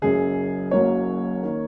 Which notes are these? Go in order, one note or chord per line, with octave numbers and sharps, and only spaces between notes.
F#1 F#2 C#3 G#4
F#1 F#2 F#3 A#3 C#5
D#3 A#3